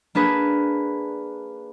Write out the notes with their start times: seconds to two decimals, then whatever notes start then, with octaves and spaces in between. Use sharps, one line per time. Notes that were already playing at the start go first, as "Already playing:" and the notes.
0.15 A#3 D4 G#4 B4